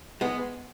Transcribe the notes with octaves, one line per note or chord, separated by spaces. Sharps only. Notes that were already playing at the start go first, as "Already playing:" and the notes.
G#3 B3